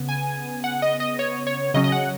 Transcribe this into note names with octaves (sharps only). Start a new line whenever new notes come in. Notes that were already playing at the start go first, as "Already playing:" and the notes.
Already playing: C#3 B3
G#5
F#5
D#5
D#5
C#5
C#5
C#3 F#3 C#4 D#5
D#5
F#5